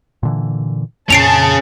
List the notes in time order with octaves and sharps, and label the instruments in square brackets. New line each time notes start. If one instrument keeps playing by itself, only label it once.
[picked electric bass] A#2 D3 E3
[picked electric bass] F2 A#2 [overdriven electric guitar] C#4 G#4 [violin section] A5 [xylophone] C7 D7 F7